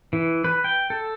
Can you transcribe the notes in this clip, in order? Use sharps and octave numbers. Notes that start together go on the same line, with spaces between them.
E3
B4
G5
A4